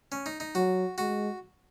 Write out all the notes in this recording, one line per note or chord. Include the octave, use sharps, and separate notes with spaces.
C#4
D#4
D#4
F#3 F#4
G#3 F#4